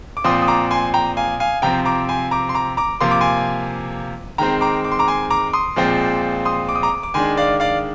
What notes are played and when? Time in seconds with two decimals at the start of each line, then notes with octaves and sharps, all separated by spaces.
0.17 D6
0.24 A#2 F3 C4 C6 D#6
0.42 D#6
0.48 A#5 D6
0.71 G#5 C6
0.94 G5 A#5
1.17 F5 G#5
1.40 F5 G#5
1.62 C3 F3 C4 G5 A#5
1.85 A#5 D6
2.09 G#5 C6
2.31 A#5 D6
2.49 C6
2.55 A#5 D6
2.77 A#5 D6
3.01 C3 F3 A#3 C6
3.11 D6
3.21 G#5 C6
4.38 D#3 G#3 C4 G5 A#5
4.61 A#5 D6
4.84 D6
4.92 C6
4.99 A#5 D6
5.08 G#5 C6
5.30 A#5 D6
5.53 C6 D#6
5.76 A#2 F3 G#3 C4
6.45 C6 D#6
6.69 D6
6.76 D#6
6.83 A#5 D6
7.03 D6
7.14 D#3 G#3 D4 G#5 C6
7.37 D5 F5
7.60 D5 F5